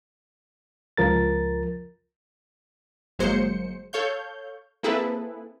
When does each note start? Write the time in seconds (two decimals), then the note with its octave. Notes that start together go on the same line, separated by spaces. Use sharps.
0.97 C#2 F3 A#4 A6
3.19 G1 F#3 G#3 A#3 C5 C#7
3.93 A4 C#5 F5 G6
4.83 A#3 C4 E4 G#4 A4 B4